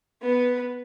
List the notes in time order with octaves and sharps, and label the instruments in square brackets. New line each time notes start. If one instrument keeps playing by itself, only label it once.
[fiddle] B3 B4